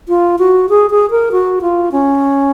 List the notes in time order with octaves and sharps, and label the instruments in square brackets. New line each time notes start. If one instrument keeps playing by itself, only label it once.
[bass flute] F4
F#4
G#4
G#4
A#4
F#4
F4
C#4